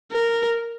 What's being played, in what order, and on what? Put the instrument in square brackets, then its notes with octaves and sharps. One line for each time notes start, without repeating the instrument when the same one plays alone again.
[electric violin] A#4